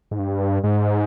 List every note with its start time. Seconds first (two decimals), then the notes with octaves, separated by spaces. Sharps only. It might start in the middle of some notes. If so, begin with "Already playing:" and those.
0.11 G#2
0.19 G2
0.64 G#2